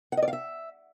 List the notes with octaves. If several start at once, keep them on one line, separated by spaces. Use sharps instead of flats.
F#5
D#5
D5
F5
E5